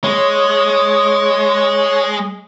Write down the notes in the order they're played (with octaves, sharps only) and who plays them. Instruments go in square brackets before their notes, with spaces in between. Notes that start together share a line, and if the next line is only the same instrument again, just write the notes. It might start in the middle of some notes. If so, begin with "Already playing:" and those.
[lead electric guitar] G#3 [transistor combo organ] C#5